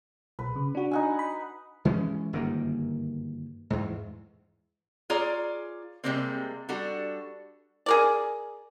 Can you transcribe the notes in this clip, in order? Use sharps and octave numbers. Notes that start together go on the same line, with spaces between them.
B1 B4
C#3
D4 F#4
D#4 F#5 G#5
B5
E3 G#3 A3 C#4
G1 F#2 D#3 A#3
E2 G#2
F4 G#4 C#5 D5 A#5
C3 E3 G3 G#3 A#3 C4
G3 D4 F#4 A4
G#4 A#4 D5